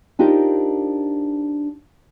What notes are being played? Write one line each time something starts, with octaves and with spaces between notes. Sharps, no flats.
D4 D#4 F4 G4 A#4 C5